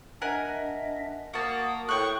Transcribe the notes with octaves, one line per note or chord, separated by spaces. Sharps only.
D4 A#4 D#5 E5 F#5 G#5
A#3 F#4 A5 D#6
A2 G5 C#6 F#6